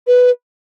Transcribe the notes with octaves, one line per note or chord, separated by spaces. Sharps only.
B4